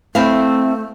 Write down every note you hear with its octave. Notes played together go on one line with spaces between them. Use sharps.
A3 C4 E4 F5